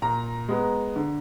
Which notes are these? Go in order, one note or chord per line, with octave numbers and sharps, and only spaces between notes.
A#2 A#5
G#3 B3
D3